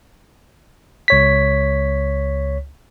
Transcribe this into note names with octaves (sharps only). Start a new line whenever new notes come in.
C#2 C#5 B6